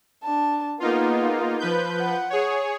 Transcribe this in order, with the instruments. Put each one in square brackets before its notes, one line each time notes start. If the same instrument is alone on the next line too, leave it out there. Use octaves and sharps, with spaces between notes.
[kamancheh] D4 A5
[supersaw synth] A#3 D#4 F4 [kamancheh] B3 G#4
[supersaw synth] F3 B4 G6
[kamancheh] F#5
[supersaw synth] G#4 C#5